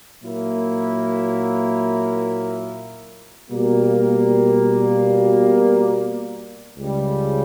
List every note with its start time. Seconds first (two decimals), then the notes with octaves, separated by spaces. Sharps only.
0.22 A#2 F#3 A#3 E4 A#4
3.50 B2 G3 A#3
6.78 C#2 C#3 G3